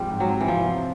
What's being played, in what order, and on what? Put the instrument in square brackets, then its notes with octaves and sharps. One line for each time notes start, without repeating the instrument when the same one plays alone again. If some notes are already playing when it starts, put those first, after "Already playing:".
Already playing: [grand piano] G#2 F3 G#3 C4 [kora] G3
[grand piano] G#2
[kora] F#3
[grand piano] C4
[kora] E3
[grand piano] C3 [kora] F3
[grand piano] C3